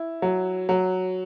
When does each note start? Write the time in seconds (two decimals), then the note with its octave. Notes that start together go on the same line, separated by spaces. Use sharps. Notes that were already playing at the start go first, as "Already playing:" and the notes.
Already playing: E4
0.22 F#3
0.69 F#3